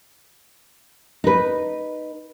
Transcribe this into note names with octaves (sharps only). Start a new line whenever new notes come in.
D#4 B4